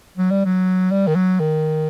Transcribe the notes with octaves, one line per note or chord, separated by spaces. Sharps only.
F#3
G3
F#3
G3
D#3
F#3
D#3